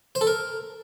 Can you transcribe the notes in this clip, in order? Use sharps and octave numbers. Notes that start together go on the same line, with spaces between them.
C5
A4
A#4